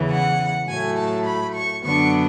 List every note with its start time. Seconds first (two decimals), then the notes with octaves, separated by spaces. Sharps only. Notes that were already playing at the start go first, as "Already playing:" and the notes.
Already playing: E2 C#3 E3
0.11 F#5
0.68 A2 F#3 A3 G#5
0.97 A5
1.26 B5
1.55 C#6
1.84 F#2 D3 F#3 B3 D4 C#6